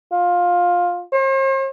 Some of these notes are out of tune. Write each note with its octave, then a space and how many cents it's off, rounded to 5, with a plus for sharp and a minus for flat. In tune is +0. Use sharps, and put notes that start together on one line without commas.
F4 +15
C5 +45